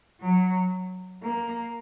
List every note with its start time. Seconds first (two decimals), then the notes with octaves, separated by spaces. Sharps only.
0.21 F#3
1.23 A#3